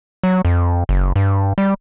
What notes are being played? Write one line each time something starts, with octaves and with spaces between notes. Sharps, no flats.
F#3
F2
F#1
G2
G3